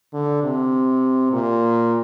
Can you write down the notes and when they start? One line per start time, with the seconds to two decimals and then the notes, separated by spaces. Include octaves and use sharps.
0.13 D3
0.43 C3
1.32 A#2